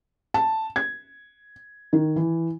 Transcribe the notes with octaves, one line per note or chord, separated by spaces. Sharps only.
A5
G#6
D#3
E3